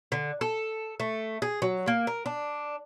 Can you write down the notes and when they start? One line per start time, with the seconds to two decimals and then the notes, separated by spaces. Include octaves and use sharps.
0.12 D3
0.41 A4
1.00 A3
1.42 G#4
1.62 F#3
1.87 A#3
2.07 A#4
2.26 D4